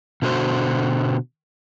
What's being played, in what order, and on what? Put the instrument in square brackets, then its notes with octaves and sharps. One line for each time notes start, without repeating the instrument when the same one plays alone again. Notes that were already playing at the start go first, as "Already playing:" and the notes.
[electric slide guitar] B2 D3 F#4 C5